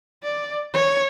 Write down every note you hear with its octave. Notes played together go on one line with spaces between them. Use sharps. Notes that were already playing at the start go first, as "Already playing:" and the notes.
D5
C#5